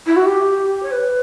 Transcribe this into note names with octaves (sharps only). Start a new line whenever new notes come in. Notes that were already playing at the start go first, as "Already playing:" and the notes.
E4
F#4
G4
C#5
B4